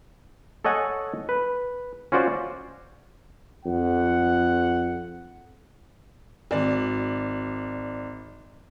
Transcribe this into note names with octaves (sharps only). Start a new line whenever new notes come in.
A4 C#5 D#5 F#5 G#5
B4
C#4 F4 F#4 C5 D5
F2 F#5
G#1 D5